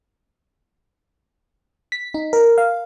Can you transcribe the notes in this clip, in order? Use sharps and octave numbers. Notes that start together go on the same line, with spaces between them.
B6
D#4
A#4
F5